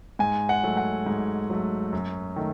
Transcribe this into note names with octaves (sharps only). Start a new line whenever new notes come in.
G#2 G#5
F#5
F#3 A3
F#5
G#2
F#3 A3
F#2
D#3 A3